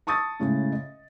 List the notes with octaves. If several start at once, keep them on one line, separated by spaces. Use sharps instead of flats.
A5 C#6 D#6 E6 A6
A2 C#3 G#3
D#5